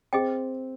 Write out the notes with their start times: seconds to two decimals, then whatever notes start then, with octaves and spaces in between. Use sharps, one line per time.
0.13 C4 G#4 D#5 G5